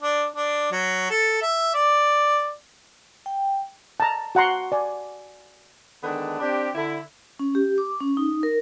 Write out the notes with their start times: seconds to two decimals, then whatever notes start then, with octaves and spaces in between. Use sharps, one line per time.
0.02 D4
0.36 D4
0.71 F#3
1.10 A4
1.42 E5
1.74 D5
3.26 G5
4.00 A5 A#5
4.35 F#4 F#5 A#5 C6
4.72 D5 G#5
6.04 D3 D#3 G#3 B3 D4
6.40 C4 D4 G4
6.75 D3 E4
7.39 C#4
7.55 G4
7.78 D6
8.00 C#4
8.17 D#4
8.43 A#4